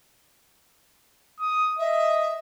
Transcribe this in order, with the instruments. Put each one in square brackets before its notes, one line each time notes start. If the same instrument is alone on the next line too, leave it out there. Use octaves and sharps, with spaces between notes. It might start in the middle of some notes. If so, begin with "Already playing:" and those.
[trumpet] D#6
[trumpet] D#5 [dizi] E5